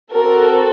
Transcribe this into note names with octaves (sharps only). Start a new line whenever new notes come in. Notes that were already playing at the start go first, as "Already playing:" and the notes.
C4 F#4 A4 A#4